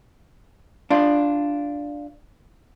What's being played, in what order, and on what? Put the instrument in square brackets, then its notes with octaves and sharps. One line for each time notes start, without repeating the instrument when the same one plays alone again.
[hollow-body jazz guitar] D4 F4